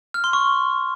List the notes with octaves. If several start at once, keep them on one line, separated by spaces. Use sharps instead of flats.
F6
C6
C#6